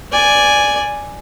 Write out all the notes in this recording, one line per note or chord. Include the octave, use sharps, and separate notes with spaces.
D5 G#5